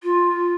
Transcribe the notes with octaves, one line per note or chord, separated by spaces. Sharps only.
F4